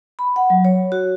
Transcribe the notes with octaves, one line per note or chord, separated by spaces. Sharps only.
B5
F#5
F#3
C#5
F#4